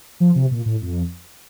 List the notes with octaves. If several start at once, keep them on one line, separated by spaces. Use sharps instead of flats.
F3
C3
A#2
A2
F2